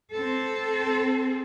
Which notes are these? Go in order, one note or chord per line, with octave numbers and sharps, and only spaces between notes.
C4 A4